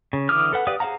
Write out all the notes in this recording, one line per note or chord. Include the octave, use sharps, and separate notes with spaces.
C#3
D3 E3 D6 D#6 F6
A4 B4 F#5
G4 B4 D5 F5 D#6
G#4 C5 F5 F#5 A#5